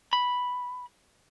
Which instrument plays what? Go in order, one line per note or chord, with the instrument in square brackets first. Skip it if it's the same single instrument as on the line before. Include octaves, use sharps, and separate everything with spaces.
[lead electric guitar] B5